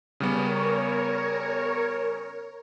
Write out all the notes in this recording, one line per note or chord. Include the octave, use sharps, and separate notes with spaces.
C#3 G3 B3 A#4 C#5